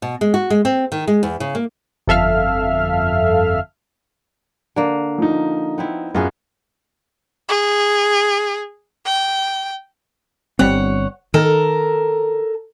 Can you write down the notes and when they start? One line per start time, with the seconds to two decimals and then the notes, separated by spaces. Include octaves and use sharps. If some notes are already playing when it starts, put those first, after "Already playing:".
0.02 B2
0.21 G#3
0.34 F#4
0.50 G#3
0.65 C4
0.92 D#3
1.07 G#3
1.23 E2
1.40 C#3
1.55 A#3
2.07 G1 F2 A4 E5 F5 F6
4.76 D3 A#3
5.18 F3 D#4
5.78 B3 C4 E4
6.15 F#2 B3 F4 G#4
7.49 G#4
9.06 G5
10.59 G1 G3 C4 C#5 F#5
11.34 D#3 A4 A#4